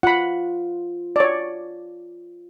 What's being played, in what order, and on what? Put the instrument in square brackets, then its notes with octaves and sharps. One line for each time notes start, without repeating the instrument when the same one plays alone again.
[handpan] F4 [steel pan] F#5 B5
[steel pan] C#5 D5